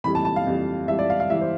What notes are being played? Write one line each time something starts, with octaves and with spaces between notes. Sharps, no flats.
F2 E3 G3 B5
A5
A5
F5
F2 E3 G3
F2 E3 G3 E5
D5
F5
F5
E3 G3 E5
C5